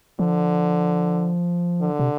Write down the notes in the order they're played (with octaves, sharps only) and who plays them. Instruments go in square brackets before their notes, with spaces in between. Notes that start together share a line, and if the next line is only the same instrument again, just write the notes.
[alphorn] D3 [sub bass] F3
[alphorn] D3
[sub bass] C3